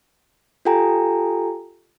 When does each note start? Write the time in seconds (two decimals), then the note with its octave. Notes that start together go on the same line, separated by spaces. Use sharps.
0.65 F4 G4 A4 G5 G#5 A#5